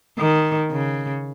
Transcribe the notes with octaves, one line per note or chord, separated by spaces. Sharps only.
D#3
C#3